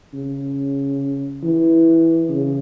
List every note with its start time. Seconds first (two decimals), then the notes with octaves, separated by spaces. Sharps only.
0.14 C#3
1.43 E3
2.30 C#3